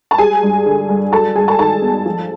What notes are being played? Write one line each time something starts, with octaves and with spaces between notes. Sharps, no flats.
A5
G3 G#4 G#5
G2
D3
G2
F#3 A4 A5
G2 G#4 G#5
A4 A5
D#3 A4 A5
B3
F3